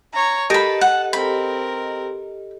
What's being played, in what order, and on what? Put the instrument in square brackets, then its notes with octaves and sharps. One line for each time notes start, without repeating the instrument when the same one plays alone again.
[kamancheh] C#5 A#5
[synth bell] G4 A4 D#5 [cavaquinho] A#4 B5 [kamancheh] A5
[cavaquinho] F#5
[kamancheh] C4 A#4 [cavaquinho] B5